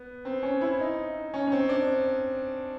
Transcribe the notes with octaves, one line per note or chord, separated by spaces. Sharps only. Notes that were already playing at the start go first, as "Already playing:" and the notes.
Already playing: B3
C4
C#4
E4
D#4
C#4
C#4
C4
D4